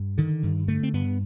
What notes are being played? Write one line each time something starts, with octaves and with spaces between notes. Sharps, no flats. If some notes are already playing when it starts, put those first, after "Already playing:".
Already playing: G2
D3 D#3
G2 D#3
D3 A3
C4
G2 B3